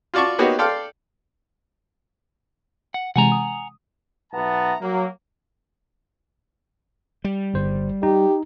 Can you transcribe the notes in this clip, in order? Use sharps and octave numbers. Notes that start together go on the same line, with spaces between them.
F4 F#4 D5 A5 C#6
A#3 B3 D#4 F#4 G4 C#5
A4 D5 F5 G5 C6 F6
F#5
C3 E3 G#3 F#5 G#5 A#5
D#6
B1 B3 E5 F#5 A5 A#5
F#3 A#3
G3
G1 C5
D#4 G4